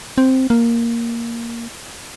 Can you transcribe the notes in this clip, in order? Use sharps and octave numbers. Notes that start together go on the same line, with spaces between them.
C4
A#3